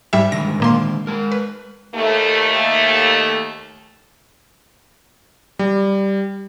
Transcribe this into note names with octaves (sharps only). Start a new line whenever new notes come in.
G#2 G3 E5
D3 D#3 G#3 A#6
A#2 A#3 C6
G#3 A#4
B4
D#2 A3
G3